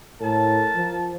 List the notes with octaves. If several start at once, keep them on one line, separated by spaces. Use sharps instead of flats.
A2 A#4 A5
F3